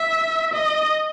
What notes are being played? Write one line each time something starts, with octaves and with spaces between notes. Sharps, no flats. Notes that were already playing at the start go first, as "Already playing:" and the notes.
Already playing: E5
D#5